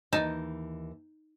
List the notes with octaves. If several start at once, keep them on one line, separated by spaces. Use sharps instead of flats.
D#2 E3 D#4 D#5 A5